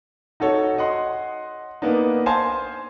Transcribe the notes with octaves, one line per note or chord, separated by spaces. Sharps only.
D#4 F#4 A4 C#5
D#5 F#5 C6
A#3 B3 D4 D#4
C5 F5 G#5 A5 C6